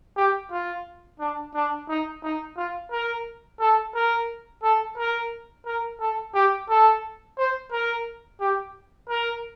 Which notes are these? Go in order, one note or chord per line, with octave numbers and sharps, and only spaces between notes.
G4
F4
D4
D4
D#4
D#4
F4
A#4
A4
A#4
A4
A#4
A#4
A4
G4
A4
C5
A#4
G4
A#4